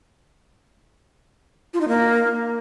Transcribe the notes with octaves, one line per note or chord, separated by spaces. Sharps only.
F4
D#4
A#3